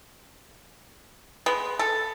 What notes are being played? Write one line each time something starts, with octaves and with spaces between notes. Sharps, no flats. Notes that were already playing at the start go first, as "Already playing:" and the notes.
G#3 B3
A4